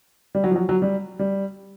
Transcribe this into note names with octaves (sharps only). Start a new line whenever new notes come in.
G3
F#3
F3
F#3
F#3
G3
G3